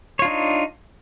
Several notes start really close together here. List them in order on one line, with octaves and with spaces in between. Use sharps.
C#5 F4 D4 D#4